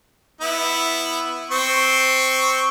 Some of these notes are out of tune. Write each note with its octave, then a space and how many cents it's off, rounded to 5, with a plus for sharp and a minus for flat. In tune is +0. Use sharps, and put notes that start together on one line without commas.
B3 +0 E4 +0
C4 +0 C#6 +0